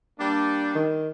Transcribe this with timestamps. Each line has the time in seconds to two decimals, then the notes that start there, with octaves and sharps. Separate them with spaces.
0.19 G3 A#3 D4
0.75 D#3